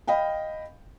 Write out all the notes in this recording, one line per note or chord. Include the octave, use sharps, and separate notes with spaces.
D#5 F5 G5 B5